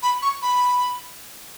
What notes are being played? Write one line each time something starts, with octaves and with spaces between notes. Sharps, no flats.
B5
C#6
B5